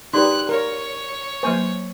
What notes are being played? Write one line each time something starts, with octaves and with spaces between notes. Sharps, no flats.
D#4 F#4 G4 B4 D5 F#6
A#4 C#5
F#3 A#3 B4 C5 G#5 C#6